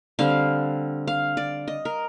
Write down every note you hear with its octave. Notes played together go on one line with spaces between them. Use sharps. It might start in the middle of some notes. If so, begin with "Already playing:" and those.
D3 G3 C4 F5
F5
D5
D#5
A#4